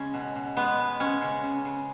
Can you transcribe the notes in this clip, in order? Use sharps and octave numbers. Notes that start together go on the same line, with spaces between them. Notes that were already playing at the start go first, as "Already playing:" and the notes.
Already playing: C#3 G#3 C#4
B2
B2
G#3 B3
G#3
G#3 C#4
C#3
C#3
C#3